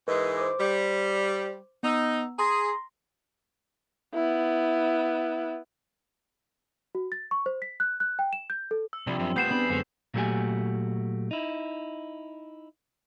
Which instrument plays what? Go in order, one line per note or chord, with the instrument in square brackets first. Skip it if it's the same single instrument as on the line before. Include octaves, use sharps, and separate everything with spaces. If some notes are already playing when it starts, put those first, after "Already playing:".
[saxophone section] G#2 E3 G#3 [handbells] A#4 B4 D#5
[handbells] C5 D6
[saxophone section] G3
[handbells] B3 A#5 E6 [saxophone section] D#4
[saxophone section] G#4 [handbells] A#5 C6 A#6
[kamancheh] B3 E4
[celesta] F#4
A6
C#6
C5
B6
F#6
F#6
G5
E7
G6
A4
[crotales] E6
[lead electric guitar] C2 [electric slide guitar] F3 C4 D4 [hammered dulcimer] G3
[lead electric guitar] F#2 [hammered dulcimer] C3
[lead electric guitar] A3 F4 [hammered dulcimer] B3 [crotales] G6 C7 E7
[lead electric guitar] E2 B5 [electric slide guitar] B3 C4 D4 [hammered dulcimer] G#4
[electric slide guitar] F#2 G#3 [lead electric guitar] D3 [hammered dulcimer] C4 C#4
[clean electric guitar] A#2 F#3 A3 F#4 G4 G#5
D#4 E4